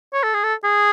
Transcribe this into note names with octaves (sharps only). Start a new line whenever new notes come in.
C#5
A4
G#4
A4
G#4